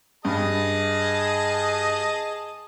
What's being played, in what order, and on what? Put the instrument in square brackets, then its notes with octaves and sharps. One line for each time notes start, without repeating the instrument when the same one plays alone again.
[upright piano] G2 [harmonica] G#4 D#5 A5